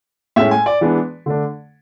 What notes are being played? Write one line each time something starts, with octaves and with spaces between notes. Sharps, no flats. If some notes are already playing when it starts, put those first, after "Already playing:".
A2 G#3 C#4 E5
G#5
D5
E3 G#3 B3 D4
D3 A3 D4